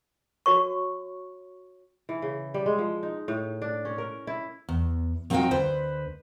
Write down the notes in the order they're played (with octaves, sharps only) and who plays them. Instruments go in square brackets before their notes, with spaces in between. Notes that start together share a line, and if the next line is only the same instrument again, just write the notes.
[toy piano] F#4 C#5 C#6
[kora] E3
C#3
G3
G#3
F3
D#4
A2
D4
C#4
A#4
E4
[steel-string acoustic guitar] E2
F3 C4 D#4 F#4 F5 G5
D2 B4 C5